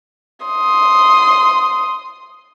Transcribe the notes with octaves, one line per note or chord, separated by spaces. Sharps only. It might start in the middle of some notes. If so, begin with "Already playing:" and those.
C6 D#6